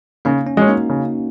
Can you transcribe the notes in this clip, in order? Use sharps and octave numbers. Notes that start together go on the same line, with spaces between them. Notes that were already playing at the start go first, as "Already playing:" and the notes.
C#3 A#3 D#4
C#4
G#3 C#4 F#4
A#3 D#4
C#3